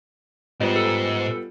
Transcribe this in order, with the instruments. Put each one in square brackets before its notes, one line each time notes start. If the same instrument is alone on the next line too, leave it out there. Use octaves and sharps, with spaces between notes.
[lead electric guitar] G#2 [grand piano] G3 B3 F4
[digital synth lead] A4